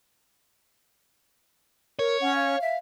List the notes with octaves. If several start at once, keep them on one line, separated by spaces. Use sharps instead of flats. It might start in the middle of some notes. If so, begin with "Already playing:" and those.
A#4 C#5
C#4 F#5
F5
E5